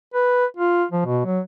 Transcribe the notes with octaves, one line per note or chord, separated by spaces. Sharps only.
B4
F4
F3
B2
F#3